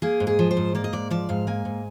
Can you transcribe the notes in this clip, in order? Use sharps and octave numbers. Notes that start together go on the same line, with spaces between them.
A#3 G#4
G#2
G#4
F3
C5
G#2
A#3 D5
D#5
G#2 D5
F3 D5
G#2 F5
A#3 G#5
G#2